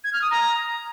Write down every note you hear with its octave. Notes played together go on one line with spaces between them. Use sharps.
G#6
F6
D#6
A#5